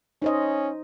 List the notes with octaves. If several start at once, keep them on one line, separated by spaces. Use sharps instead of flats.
C#4 D#4 C5 D#5